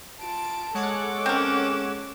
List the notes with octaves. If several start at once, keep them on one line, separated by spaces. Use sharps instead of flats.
F4 A5 D7
G#3 A4 C#5 F#5 D6
C4 C#4 A#4 E7